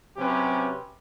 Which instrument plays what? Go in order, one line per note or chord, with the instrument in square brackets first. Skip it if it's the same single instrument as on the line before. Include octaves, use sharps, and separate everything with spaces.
[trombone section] C3 F#3 C4 C#4 G4 B4